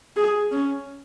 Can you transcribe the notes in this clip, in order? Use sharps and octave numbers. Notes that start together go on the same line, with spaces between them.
G#4
C#4